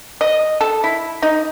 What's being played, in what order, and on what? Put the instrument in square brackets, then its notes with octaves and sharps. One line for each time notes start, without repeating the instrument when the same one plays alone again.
[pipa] D#5
A4
E4
D#4